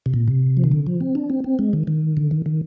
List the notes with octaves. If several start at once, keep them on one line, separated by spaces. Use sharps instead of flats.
C3
A#2
C3
F3
D#3
D3
F3
C4
D4
C4
C4
G#3
D#3
D#3
D3
D#3
D#3